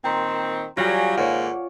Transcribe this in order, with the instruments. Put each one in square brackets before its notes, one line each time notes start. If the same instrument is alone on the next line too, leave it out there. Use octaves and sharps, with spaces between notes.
[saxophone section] A#2 D#3 C4 [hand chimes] G5 A#5 C6
[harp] E7
[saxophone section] F#3 G3 [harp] F4 D5 G#5 [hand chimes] A#6
[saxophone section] G#2 D#3 A#3 [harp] C#5 D5 [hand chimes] F#5